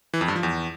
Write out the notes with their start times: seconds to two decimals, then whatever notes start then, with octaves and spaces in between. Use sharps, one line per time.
0.14 E3
0.21 F2
0.28 G2
0.36 F3
0.43 E2